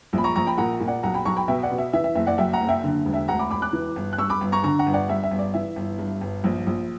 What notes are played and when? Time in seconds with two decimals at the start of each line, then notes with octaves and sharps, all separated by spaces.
0.13 A#1 B5
0.24 A#5 C#6
0.35 A#1 A#5 C#6
0.47 G5 B5
0.58 A#2 F#5 A#5
0.80 A#2
0.88 D5 F#5
1.03 B1 F#5 A#5
1.14 G5 B5
1.25 B1 A#5 C#6
1.37 G5 B5
1.48 B2 E5 G5
1.63 D5 F#5
1.71 B2
1.78 E5
1.93 E3 E5
2.04 E5
2.15 F#1 E5
2.26 D5 F#5
2.38 F#2 E5 G5
2.53 F#5 A#5
2.61 F#1
2.69 E5 G5
2.84 D3
3.05 E1
3.13 E5 G5
3.28 D2 F#5 A#5
3.39 B5 D6
3.50 E1 B5 D6
3.62 D6 F#6
3.73 E3
3.96 G1
4.13 F#6
4.18 G2 C#6 E6
4.30 B5 D6
4.41 G1
4.52 A#5 C#6
4.64 D3 A#5 C#6
4.79 F#5 A#5
4.87 G1
4.94 D5 F#5
5.09 G2 E5
5.24 E5
5.31 G1
5.39 D5
5.54 E3 E5
5.76 G1
5.98 G2
6.21 G1
6.44 A#1
6.67 A#1